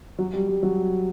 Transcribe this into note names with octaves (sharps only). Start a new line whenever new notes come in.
F#3
G3
G3
F#3